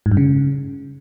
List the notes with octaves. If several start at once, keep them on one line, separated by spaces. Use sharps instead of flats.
G#2
G2
C#3